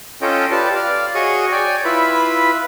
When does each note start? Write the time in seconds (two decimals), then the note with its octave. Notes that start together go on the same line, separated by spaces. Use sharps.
0.22 C#4 F4 A4 C#5 D#5 G5
0.52 F4 G4 B4 D5 A5
0.75 D5 F5
1.15 F#4 G#4 C#5 D#5 C#6 D#6
1.52 C#5 D5 G5 G#5
1.85 E4 F4 B4 E5 B5